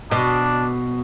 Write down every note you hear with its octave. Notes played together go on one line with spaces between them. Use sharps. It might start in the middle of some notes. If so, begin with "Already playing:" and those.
B2 D4